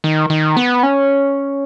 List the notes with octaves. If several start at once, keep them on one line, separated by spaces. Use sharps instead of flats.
D#3
D#3
B3
C#4